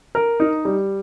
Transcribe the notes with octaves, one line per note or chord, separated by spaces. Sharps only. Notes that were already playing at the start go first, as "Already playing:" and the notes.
A#4
D#4
G3